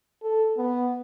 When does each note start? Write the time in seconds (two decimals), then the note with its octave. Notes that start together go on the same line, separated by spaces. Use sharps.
0.23 A4
0.57 B3